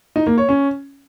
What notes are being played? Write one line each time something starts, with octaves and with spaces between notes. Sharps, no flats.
D#4
A#3
C#5
C#4